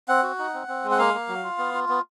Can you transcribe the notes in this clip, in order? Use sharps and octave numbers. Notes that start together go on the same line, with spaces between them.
C4 F#5
F#4
D#4
C4
C4
G#3
F#5
A#3 F5
A#3
F#3
F4
B3
F4
B3